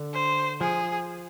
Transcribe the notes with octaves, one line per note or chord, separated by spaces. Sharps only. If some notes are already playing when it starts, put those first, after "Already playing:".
Already playing: D3
C5
F3 G#4